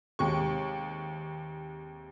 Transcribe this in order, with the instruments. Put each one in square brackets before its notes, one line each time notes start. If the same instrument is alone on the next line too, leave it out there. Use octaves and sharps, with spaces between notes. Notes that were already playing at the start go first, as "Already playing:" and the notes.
[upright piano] D#2 C3 G#3 C#6